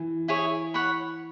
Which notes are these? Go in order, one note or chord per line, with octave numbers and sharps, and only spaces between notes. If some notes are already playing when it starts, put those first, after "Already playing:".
Already playing: E3
E4 G#4 C#5
C#5 F#5 B5